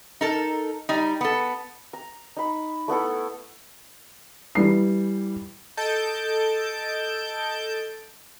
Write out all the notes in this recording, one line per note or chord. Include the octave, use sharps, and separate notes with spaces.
D#4 A4 A#4
G3 D#4
B3 A4
A#5
D#4 B5
A3 B3 E4 A4
E3 G3 C7
A4 D#5 A5 G6 D7